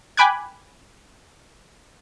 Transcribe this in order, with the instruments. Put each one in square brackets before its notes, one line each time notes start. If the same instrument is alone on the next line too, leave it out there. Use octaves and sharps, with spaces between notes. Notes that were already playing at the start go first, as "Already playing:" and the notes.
[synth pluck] G5 G#5 B5 D6 F#6 G#6